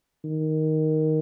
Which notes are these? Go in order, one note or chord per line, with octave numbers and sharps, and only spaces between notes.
D#3